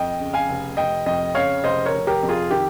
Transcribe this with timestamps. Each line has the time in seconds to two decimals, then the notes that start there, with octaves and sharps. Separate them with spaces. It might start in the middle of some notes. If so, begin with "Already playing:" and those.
Already playing: F2 D#5 G5
0.20 C#3
0.34 F5 G#5
0.49 F1
0.77 F1 D#5 G5
1.06 F2 D#5 G5
1.35 C#3 C#5 F5
1.64 F1 C5 D#5
1.86 A#4 C#5
1.93 F1
2.07 G4 A#4
2.23 F2
2.29 F4 G#4
2.51 D#3 G4